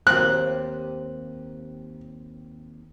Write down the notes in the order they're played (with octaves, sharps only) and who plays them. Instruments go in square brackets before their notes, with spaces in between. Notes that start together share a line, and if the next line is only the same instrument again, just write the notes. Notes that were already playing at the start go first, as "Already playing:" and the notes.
[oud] D#2 C4 [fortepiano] F#6